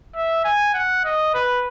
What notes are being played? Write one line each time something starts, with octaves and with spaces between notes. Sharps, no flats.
E5
G#5
F#5
D#5
B4